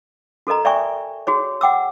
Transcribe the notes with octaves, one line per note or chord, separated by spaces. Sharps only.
F#4 A4 A#4 D#5 A#5
D5 E5 G5 G#5 C#6
F#4 G#4 C#5
F#5 G5 D6 E6